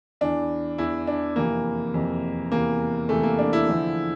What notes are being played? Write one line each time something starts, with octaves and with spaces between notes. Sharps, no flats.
E2 E3 D4
E2 E3 E4
D4
F2 C3 E3 A#3
F2 C3 E3
E2 C3 E3 A#3
E2 C3 E3 A3
A#3
D4
E4
E2 D3 F3